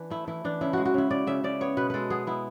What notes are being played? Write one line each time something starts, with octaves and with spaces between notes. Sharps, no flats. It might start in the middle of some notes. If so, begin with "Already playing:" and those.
Already playing: E3 D4
A3 E4
E3 E4
E3 D4
C#3 E4
G#3 F#4
F#4
C#3 E4
C#3 D5
C#3 E5
C#3 D5
B3 C#5
B2 B4
G#3 A4 B4
B3 G#4
B3 E4